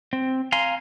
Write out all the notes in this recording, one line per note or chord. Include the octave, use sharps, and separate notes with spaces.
C4
F5 G#5 A#5 C6